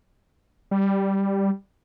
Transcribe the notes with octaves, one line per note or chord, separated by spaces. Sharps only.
G3